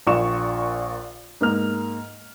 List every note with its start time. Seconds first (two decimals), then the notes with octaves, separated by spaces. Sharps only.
0.07 A#1 A#2 F4 C#6 E7
1.41 G#2 A#3 F6